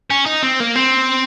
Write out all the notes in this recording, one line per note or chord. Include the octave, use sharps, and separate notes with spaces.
C#4
D#4
C4
A#3
C4